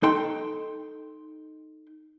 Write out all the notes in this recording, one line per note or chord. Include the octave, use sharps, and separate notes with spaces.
D#4 A4 G5 C6